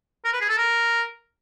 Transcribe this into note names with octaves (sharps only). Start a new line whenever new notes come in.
A#4
B4
G#4
A4
A#4